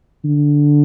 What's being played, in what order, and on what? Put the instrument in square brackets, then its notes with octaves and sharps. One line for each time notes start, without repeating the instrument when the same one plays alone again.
[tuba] D3